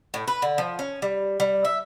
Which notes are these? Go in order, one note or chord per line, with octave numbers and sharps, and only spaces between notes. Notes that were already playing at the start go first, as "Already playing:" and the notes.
A2
B4
D3
F3
C#4
G3
G3
E5